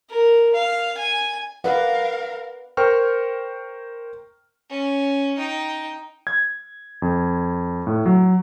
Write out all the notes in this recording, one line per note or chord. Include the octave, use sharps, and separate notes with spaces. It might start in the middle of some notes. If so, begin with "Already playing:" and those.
A#4
F5
G#5
A#4 B4 D5 F5 F#5
A#4 C5 G5 C#6 F6
C#4
D#4 G5
G#6
F2
A2
F#3